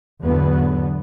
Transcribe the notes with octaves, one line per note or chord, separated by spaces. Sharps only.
E2 G#2 D3 F#3 B3